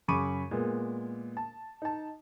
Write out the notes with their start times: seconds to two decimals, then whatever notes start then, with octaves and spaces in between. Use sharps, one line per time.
0.08 F#2 C#3 B5 C#6 D6 D#7
0.51 A#2 G#3 B3
1.37 A5
1.82 D#4 A5